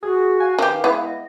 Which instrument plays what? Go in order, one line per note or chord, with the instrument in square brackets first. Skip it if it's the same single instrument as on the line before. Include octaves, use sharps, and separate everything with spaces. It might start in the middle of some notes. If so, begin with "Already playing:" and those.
[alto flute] F#4 [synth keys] G#4
[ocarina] F5 [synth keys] G#5
[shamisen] D#3 G4 [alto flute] B4
[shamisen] G#3 B3 [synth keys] E4
[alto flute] D#5